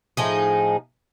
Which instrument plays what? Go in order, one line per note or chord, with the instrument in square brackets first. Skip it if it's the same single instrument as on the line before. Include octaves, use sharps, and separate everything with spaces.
[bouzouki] A2 F3 D#4 G#4